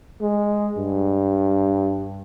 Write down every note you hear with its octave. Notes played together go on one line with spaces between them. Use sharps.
G#3
G2